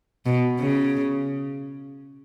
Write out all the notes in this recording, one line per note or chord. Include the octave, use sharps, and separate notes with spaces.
B2
C#3